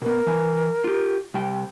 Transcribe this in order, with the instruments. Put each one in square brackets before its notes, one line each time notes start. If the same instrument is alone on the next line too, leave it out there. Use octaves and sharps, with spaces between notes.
[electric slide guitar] B2 B3 [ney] A#4
[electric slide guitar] E3 G#5
F4 G4
C3 G3 G5